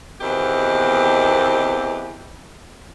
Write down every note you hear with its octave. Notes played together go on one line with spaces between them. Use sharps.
E2 B2 D#3 C4 G4